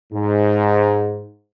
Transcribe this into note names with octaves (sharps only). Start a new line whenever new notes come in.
G#2